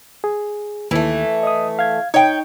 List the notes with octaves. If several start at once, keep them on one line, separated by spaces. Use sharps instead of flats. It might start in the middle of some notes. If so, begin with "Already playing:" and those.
G#4
D#2 E3 A3
D#5 D#6
F5 G#6
D#4 C#5 G5